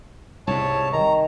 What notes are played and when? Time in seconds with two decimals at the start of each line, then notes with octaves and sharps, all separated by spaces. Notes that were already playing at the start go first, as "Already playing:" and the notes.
0.47 C2 G#2 C#5 A5
0.93 D#3 A#5